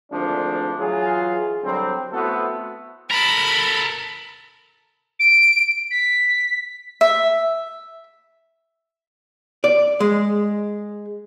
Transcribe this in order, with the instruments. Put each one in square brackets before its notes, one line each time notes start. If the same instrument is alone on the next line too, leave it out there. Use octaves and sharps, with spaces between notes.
[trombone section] G#1 D2 F3 D4
E3 F#3 F4 G#4
D3 F#3 G3 C4
A3 B3 C4 E4 F#4 A4
[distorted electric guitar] A4 A#4 [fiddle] B5
[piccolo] D7
B6
[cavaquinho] E5
[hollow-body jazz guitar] D5
G#3